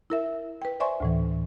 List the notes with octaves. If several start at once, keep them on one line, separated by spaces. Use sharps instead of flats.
E4 A#4 E5
B4 G5
C5 D5 E5 G#5 C6 C#6
D2 A2 E3